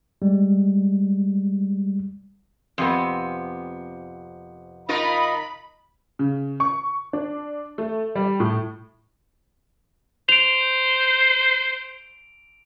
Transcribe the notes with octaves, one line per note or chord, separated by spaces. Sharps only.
G3 G#3
F2 C3 B3
D#4 F4 A#4 B5
C#3
C#6
D4
A3
G3
A2
C5 D7 F7